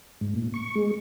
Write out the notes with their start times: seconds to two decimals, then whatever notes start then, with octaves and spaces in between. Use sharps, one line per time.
0.21 G#2
0.36 A#2
0.54 C#6
0.75 G#3